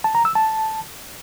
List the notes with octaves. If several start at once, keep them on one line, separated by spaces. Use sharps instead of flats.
A5
A#5
E6
A5